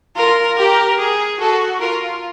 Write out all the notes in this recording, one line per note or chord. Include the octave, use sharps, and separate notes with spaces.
F4 A#4
G4 A#4
G#4
F#4 A4
F4 A#4